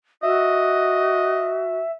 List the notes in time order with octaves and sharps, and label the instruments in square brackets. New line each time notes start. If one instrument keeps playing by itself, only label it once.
[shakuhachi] F#4 [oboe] D#5 [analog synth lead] E5